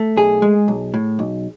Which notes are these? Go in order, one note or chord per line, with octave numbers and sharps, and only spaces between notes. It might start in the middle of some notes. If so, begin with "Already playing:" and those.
Already playing: A3
B1 G#4
G#3
B1
A2
B1